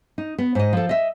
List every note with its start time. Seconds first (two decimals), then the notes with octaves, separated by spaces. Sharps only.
0.18 D#4
0.38 B3
0.55 G#2 D#5
0.73 F3 A4
0.89 D#5 E5